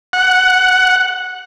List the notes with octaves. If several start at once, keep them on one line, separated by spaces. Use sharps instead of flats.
F#5